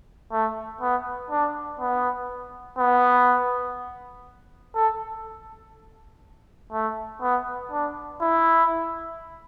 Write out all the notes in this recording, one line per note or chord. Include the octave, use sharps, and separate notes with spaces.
A3
B3
D4
B3
B3
A4
A3
B3
D4
E4